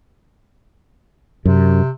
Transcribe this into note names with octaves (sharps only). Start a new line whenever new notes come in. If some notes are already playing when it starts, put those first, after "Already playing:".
F#2 C3